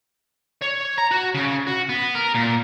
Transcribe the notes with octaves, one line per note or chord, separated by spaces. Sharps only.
C#5
A#5
F#4
C#3
F#4
B3
A#4
A#2